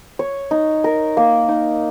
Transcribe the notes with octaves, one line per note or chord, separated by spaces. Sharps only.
C#5
D#4
A#4
A#3
D#4